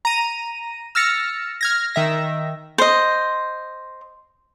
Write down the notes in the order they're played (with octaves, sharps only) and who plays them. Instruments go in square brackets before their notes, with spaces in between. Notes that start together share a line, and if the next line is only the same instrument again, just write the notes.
[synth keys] A#5 D#7
E6 F6 A6 A#6 C#7
F6 G#6 A#6
D#3 E5 A#6
[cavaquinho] C5 D#5